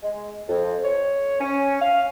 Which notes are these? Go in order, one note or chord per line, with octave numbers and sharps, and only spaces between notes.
G#3
F2
C#5
C#4
F5